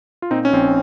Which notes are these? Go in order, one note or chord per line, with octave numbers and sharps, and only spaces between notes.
F4
A#2 C4 D#4
C#4
A#1 C4